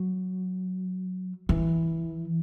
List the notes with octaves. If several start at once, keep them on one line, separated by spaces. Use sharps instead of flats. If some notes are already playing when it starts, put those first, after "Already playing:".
Already playing: F#3
E3